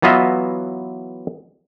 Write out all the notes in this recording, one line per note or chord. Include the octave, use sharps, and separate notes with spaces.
E3 F#3 B3 F4 D#5 E5